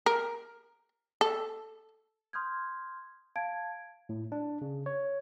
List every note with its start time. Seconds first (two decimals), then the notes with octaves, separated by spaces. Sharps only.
0.06 A#4
1.21 A4
2.33 C6 D#6 F6 G6 G#6
3.36 F5 A5 G#6 D7
4.09 A2
4.32 D4
4.61 C#3
4.86 C#5